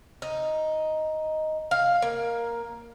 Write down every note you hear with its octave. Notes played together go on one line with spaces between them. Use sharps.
D#4
F5
A#3